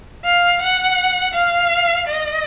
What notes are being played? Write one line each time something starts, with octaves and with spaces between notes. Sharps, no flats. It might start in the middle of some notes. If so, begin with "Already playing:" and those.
F5
F#5
F5
D#5